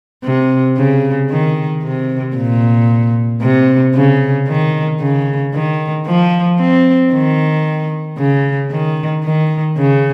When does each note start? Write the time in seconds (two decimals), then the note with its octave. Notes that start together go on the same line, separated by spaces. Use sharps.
0.24 C3
0.77 C#3
1.30 D#3
1.83 C3
2.36 A#2
3.42 C3
3.94 C#3
4.47 D#3
5.01 C#3
5.54 D#3
6.06 F3
6.59 C4
7.12 D#3
8.18 C#3
8.71 D#3
9.24 D#3
9.77 C#3